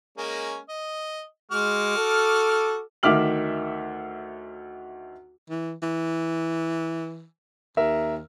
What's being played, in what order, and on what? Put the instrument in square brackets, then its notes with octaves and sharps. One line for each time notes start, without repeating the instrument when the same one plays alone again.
[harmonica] G#3 A#3 C#4
D#5
[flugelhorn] G#3 [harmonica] F#4 D6 F6
[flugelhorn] A4
[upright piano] D2 D#3 E5 D6 F6 F#7
[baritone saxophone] E3
E3
[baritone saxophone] D#2 [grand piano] A#4 E5